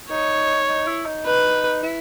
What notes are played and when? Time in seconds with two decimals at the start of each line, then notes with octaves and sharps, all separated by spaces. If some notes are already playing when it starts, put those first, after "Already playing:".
0.10 D#4 C#5
0.68 D#4
0.87 E4
1.06 D#4
1.26 D#4 B4
1.83 E4